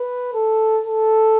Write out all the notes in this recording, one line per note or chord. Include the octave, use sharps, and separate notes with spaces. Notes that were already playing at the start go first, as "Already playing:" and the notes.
Already playing: B4
A4
A4